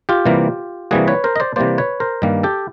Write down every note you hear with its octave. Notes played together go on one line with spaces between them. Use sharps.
F4 G4
C3 E3 G3 A#3
C3 E3 G3 A#3 F#4 G#4
B4 C#5
A#4 C5
D#5
C5 D5
C3 E3 G3 A#3 C5 D5
B4 C#5
A#4 C5
G2 D#3 G3 A#3
G4 A4